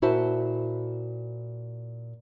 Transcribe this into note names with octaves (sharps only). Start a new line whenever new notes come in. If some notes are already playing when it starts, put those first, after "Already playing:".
A#2 E4 F#4 C5 E5 A5